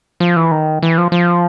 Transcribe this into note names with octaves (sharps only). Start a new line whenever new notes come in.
F3
E3
D#3
E3
F3
F3